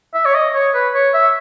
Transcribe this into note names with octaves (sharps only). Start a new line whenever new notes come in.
E5
C#5
D#5
C#5
B4
C#5
E5